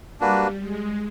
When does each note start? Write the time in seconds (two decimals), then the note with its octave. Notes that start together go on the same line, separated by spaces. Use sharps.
0.21 G3 A#3 D4 F#4 B4
0.60 G#3